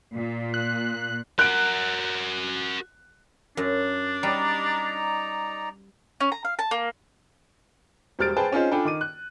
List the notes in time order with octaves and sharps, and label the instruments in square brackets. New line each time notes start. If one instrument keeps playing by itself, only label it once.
[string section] A#2
[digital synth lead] F#6
[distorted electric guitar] F#4 A#4 [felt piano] F#6 D7
[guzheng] F#2 [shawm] D4
[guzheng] G3 [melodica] D#4 D5 A#5
[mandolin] C#4
A#5
F5
A5
A#3
[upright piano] E1 G3 C5 F6 A6 D7
G#4 B4 C5 G5 A5
C4 C#4 D#4 F4 G#4 C5
D4 F4 A4 G5 G#5 B5
D#3 D6 D#7
F#6